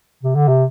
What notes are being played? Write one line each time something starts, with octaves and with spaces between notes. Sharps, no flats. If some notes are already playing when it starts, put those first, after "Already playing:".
C3
D3
C3